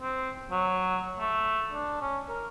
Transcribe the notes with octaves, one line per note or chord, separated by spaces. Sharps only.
C4
F#3
A3
D4
C#4
A#4